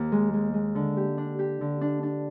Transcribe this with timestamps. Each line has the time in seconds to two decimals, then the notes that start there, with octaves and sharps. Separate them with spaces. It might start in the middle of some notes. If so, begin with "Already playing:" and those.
Already playing: D#2
0.12 G#3
0.33 G#3
0.54 G#3
0.75 D3
0.97 G4
1.18 D4
1.39 G4
1.61 D3
1.81 D4
2.03 D4